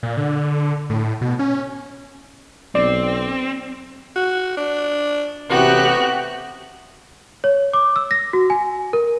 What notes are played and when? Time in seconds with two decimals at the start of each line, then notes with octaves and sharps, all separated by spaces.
0.03 A#2
0.17 D3
0.90 A2
1.21 B2
1.39 C#4
2.75 B1 C4 D5
4.16 F#4
4.57 D4
5.50 A1 C3 B3 F#4 G4 F#6
7.44 C#5
7.73 D6
7.96 E6
8.11 A#6
8.33 F#4
8.50 G#5
8.93 A#4